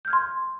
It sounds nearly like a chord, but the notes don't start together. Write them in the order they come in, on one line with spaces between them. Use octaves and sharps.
G6 F6 G#6 C6